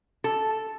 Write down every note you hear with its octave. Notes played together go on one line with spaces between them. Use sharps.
A4